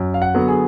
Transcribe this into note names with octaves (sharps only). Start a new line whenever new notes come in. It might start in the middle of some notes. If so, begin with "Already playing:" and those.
Already playing: F#2
F5
F#5
D3 F#3 B3
G#4